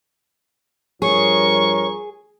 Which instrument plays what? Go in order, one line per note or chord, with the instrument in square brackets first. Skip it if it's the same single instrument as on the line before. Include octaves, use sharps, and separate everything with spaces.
[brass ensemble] G2 F3 A#4 [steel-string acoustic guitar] G#4 [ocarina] C#5 [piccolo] C#6